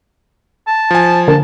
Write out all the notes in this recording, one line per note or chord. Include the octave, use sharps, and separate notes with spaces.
A5
F3 G#5
D3 A#3 A5